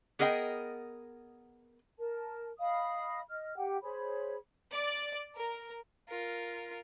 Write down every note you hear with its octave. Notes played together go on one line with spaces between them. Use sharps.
B3 G#4 A#4 D#5 F5 G5
A#4 A5
D#5 F5 B5 D#6
D#5 F6
G4 F#5 G5
G#4 C5 C#5 B5
D5
A#4
F4 A#4